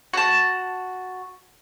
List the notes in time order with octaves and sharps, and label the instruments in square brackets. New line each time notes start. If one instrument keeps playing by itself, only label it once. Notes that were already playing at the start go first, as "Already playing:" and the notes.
[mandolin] F#4 A5